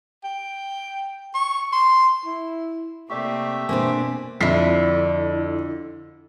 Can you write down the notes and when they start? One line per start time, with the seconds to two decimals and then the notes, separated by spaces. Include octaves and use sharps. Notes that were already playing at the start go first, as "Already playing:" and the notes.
0.24 G5
1.34 C#6
1.72 C6
2.25 E4
3.10 C3 A3 A#3 C4 G4 D5 E5 C#6
3.69 B2 A#3 C4 D4 G#5
4.41 F2 D3 E4 B6 C7